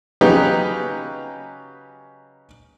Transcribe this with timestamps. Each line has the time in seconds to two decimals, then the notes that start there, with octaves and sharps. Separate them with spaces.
0.21 C#3 F#3 D#4 G4 B4